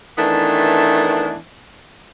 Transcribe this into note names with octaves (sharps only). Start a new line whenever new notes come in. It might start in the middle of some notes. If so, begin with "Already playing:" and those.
D#3 E3 A3 B3 D4